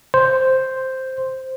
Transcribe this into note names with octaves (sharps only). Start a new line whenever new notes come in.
C5